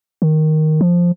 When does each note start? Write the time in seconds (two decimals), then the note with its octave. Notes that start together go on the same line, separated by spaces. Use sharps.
0.22 D#3
0.81 F3